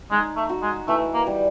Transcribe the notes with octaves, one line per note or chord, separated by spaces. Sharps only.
G#3 D#4
A3
F#4
G#3
E3 A3
A#3
G3